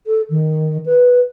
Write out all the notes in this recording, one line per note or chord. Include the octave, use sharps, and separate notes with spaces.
A4
D#3
B4